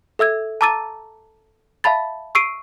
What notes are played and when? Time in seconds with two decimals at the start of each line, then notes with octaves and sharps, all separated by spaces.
0.19 A4 E5 E6 G#6
0.61 A5 A#5 D6 E6 A6 D#7
1.84 E5 F5 A5 B5 A6
2.35 C#6 E6 C7 D7 D#7